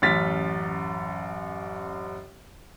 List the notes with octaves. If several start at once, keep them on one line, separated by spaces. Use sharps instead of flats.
A1 F#2 F6 A6 B6